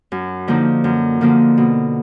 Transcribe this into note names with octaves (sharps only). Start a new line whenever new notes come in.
F#2
D3 F3 A#3 D#4
F#2
D3 F3 A#3 D#4
B2